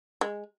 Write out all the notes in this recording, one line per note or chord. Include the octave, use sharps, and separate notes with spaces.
G#3